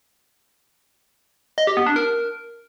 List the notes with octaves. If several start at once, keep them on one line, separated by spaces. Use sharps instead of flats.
D#5
G4
B3
D4
A#4